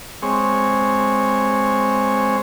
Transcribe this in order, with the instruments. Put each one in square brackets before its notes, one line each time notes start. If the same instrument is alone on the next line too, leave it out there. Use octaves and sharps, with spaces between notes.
[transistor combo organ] G#3 C4 C#5